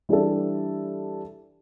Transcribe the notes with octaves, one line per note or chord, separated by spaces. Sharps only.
E3 G3 D4 A4